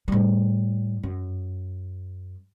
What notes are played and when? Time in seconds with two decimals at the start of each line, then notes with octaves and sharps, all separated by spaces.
0.08 A2 G3
1.03 F#2